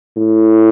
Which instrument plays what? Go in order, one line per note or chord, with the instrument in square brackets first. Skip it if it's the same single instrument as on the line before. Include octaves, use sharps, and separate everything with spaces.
[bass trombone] A2